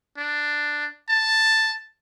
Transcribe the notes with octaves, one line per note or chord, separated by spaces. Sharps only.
D4
A5